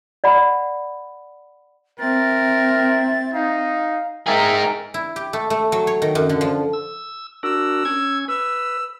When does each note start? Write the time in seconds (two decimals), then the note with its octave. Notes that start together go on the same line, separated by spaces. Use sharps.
0.24 D5 F#5 B5
1.99 C4 A#4 E5 A6
3.33 D#4 F5
4.27 D#4 G#4 A#4 E5 G5
4.94 E4
5.16 G4
5.33 A3
5.50 A3
5.72 F#3
5.87 C#5
6.02 D#3
6.15 F#2
6.29 D3
6.41 F3
6.73 E6
7.43 D4 F#4 A#4 E6
7.85 C#4 G#6
8.28 B4 E6